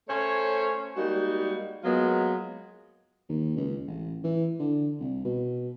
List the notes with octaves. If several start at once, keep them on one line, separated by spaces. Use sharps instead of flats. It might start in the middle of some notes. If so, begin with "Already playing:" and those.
A3 C#4 C5 C#5
G3 G#3 A#3 D#4 F#4
F#3 G#3 A#3 B3 F4
D#2
C#2
A1
E3
D3
C2
B2